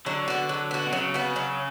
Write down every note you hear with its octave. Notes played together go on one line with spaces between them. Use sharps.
D3 F#3
B3 F#4
F#3
B3 F#4
B2
C#3 F#3
B3 F#4
F#3